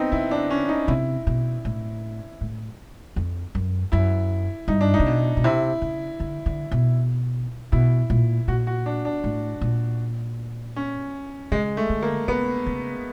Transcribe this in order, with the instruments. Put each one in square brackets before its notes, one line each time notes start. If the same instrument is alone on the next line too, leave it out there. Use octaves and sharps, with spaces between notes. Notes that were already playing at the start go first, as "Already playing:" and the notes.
Already playing: [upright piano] B3 C4 D#4
[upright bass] C#3 [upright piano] E4
[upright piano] D4
C#4
D#4
[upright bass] C3 [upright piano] E4
[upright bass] B2
A2
A2
F2
F#2
[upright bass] F#2 [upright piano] E4
[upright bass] G2 [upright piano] D#4
[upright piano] D4
D#4
[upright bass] C3
B2
B2
[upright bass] C3 [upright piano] E4
[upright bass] C#3
D3
D3
B2
[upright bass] B2 [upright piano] E4
[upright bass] A#2
[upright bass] A#2 [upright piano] F#4
[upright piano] F#4
D4
D4
[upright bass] A2
A#2
[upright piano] C#4
[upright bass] C#3 [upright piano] G#3
[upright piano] A3
[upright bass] D3
[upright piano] A#3
[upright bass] C#3 [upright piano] B3
[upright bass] C#3